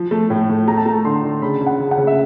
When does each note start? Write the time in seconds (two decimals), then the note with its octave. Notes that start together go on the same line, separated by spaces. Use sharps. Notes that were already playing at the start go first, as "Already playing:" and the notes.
Already playing: F3
0.11 A3
0.30 A2
0.49 A2
0.68 A3 A#5
0.77 A5
0.86 A3 A#5
1.05 D3 C6
1.23 D3
1.42 C#3 B5
1.61 C#3
1.66 F#5
1.79 C#3
1.91 F#5
1.98 C#3
2.07 E5